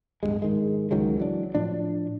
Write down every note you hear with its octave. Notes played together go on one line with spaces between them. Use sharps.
D1 C#2 G2 G#3
G#2 D#3 G#3
C#2 D#3 F#3 G#3
E3 F#3 D4
A2 F3 D4